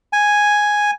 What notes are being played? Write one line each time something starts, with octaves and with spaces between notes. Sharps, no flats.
G#5